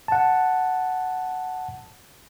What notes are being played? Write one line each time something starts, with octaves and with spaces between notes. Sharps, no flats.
F#5 A5